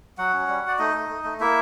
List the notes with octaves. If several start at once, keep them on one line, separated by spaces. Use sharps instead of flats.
F#3 F#4 F#5
C#4
G3
F#4 D5
A3 D#4 D#5
A3
A3
A3
A#3 E4 E5